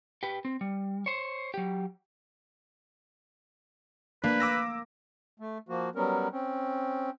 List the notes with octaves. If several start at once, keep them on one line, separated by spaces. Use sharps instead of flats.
G4 B4
C4
G3
C5 C#5
F#3 G4
A#3 D4 B4
D6 E6 A#6
A3
F3 A#3 F#4
F#3 G3 B3 C#4 A#4
C4 C#4